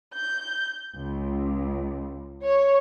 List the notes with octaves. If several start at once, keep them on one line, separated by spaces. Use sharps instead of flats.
G6
C#2
C#5